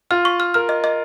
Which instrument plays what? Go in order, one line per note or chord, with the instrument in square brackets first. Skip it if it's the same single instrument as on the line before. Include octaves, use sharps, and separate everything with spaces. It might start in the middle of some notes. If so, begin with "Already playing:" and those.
[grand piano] F4 [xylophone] F6
[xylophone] C#6
F6
[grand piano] A#4 [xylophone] F6
[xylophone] D#5
D#5